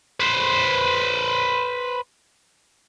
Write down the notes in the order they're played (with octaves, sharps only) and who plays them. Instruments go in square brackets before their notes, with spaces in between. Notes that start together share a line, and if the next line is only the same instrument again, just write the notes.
[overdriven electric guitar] B4 C5